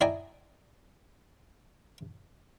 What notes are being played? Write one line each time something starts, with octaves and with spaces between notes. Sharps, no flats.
E4 D5 D#5 G5 G#5 A#5